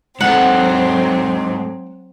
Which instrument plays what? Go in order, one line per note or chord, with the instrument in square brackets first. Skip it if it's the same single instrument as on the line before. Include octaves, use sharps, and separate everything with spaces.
[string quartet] F#3 C4 [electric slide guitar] G#3 D#4 A4 [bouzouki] F#5